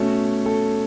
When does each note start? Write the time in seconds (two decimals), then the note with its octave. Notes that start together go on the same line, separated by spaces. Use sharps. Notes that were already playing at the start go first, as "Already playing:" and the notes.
Already playing: B2 A3 C#4
0.46 A4